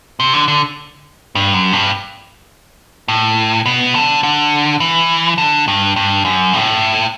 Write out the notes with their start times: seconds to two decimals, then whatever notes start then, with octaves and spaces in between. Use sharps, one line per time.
0.20 C3
0.33 D3
0.48 D3
1.35 G2
1.54 F#2
1.73 G2
3.08 A2
3.66 B2
3.94 D3
4.23 D3
4.80 E3
5.38 D3
5.68 G2
5.96 G2
6.25 F#2
6.54 A2